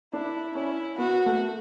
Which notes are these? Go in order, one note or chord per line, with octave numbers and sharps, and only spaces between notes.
D4 E4
C#4 E4
B3 F#4
A3